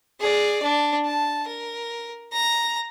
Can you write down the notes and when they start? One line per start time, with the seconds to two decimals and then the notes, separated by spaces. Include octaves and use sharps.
0.20 G#4 D5
0.63 D4
1.05 A5
1.47 A#4
2.32 A#5